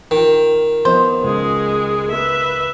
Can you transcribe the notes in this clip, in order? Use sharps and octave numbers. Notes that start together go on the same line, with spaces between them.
D#3 F4 G5
F3 B3 C5 D#5
C#2 G#3 G#4
B4 E5